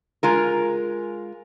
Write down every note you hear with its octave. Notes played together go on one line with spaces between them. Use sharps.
G#3 F4 A#4